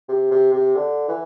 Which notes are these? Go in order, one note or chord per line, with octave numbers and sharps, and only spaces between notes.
C3
C3
C3
D3
E3